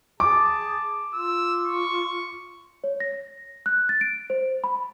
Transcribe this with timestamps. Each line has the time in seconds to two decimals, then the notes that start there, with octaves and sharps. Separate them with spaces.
0.20 G#4 A5 D6
1.14 F4 E6
1.66 C#6
2.84 C#5
3.00 A#6
3.66 F#6
3.89 A6
4.01 D7
4.30 C5
4.64 B5